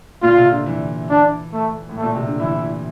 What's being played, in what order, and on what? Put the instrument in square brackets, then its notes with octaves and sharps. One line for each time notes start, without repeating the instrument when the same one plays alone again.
[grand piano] A#2 [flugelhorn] F4
[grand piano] C3
D3
E3
[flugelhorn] D4
A3
[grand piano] A2
[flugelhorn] A3
[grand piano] A#2
C3
D3
[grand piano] E3 [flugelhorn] E4